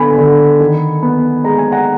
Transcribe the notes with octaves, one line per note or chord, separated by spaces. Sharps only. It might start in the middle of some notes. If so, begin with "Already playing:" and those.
Already playing: D3 B3 G#5 B5
D3
D#3
B3
G#3 A#5
G#5
F#5 A#5